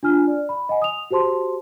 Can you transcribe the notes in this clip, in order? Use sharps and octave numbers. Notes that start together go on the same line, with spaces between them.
D4 F4 G#5 F6
D5
B5
D#5 F#5 G#5
D#6 F7
F#4 G4 C5 A5 C6